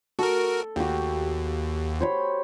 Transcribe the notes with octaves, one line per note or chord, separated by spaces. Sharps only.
F#4 A4 A#4
D#2 F#4 G4
C5 C#5 B5